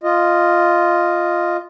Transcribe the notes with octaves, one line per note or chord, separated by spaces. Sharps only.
F4 D#5